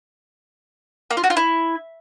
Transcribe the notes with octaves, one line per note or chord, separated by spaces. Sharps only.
A#3
F4
F#4
F4
E4